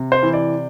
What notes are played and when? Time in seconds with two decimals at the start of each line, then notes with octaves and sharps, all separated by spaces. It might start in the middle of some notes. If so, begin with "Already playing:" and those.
Already playing: C3
0.12 C5
0.23 E3
0.33 D5